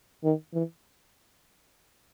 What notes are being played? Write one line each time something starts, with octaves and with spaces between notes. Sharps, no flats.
D#3
E3